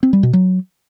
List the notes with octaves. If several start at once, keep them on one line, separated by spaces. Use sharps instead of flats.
C4
G3
B2
F#3